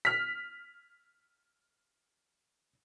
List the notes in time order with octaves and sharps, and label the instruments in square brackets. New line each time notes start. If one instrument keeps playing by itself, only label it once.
[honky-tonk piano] F6 B6